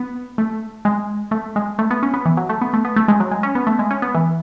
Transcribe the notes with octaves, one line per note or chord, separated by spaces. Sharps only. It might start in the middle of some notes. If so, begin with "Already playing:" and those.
Already playing: B3
A3
G#3
A3
G#3
A3
B3
C#4
B3
E3
F#3
A3
B3
A3
B3
A3
G#3
F#3
G#3
C#4
B3
A3
G#3
C#4
B3
E3